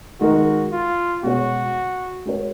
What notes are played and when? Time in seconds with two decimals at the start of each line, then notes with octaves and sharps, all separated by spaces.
0.21 D#3 G#3 D#4 F#4 A#4
0.72 F4
1.23 B2 G#3 C#4 F#4 G#4 C#5
2.26 G#3 C#4 F#4 A#4 C#5